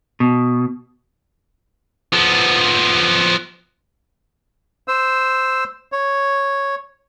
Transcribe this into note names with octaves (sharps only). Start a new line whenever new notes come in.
B2
F3 B3
C5 E6
C#5